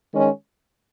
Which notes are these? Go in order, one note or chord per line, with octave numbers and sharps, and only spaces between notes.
D#3 G#3 C#4